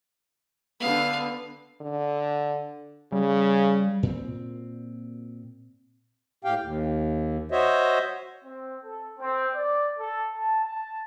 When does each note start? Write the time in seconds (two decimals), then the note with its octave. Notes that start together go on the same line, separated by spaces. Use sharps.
0.80 D3 B3 F5
1.81 D3
3.12 C#3 G3
4.03 A#2 C4
6.44 A2 G4 F5 G5
6.61 D#2
7.51 F#4 C5 C#5 D#5 E5
8.44 C4
8.85 A4
9.20 C4
9.54 D5
9.99 A4
10.34 A5
10.64 A5